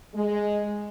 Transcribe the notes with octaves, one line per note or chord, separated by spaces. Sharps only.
G#3